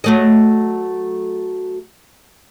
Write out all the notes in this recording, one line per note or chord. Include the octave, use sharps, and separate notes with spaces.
F#3 A3 D#5